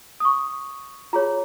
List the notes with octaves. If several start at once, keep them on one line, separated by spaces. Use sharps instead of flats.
D#6
C#6
F4 G#4 C#5 A#5